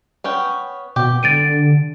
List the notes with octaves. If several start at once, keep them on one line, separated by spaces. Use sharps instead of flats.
B3 C#4 G5
B2 G4
D3 A6 D7 D#7